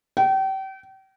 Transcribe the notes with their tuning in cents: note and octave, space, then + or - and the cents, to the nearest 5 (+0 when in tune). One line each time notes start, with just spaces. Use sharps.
G5 -35